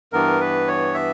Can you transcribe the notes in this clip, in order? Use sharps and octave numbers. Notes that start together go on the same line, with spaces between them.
G2 E3 B3 A#4
B4
C#5
E5